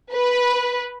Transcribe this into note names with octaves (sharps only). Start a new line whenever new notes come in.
B4